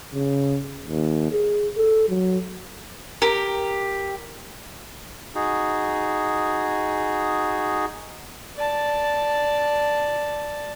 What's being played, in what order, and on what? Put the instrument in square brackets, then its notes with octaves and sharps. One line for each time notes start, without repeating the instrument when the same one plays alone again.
[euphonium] C#3
D#2
G#4
A4
F#3
[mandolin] G4 [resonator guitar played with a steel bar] A#4
[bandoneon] D#4 F#4 G#4
[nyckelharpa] D5 A5